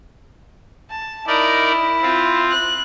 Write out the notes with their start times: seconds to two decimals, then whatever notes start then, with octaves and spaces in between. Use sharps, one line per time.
0.90 A5
1.27 D#4 E4 A#4 D5
2.02 C4 F4
2.51 F#6